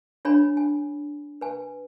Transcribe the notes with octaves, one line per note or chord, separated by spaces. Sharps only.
D4 C#5 G#5 B5
G#5
B4 G#5